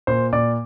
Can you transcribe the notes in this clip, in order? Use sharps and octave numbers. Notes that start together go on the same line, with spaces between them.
A#2 C5 C6
A#2 D5 D6